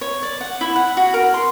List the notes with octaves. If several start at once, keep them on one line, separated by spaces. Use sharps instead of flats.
C#5
D5
F#5
E4
F#5
F#4
A#4
C6